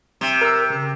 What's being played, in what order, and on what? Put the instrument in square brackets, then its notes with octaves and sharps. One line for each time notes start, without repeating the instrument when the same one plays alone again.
[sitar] C3
[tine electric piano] A#4 E6
C#3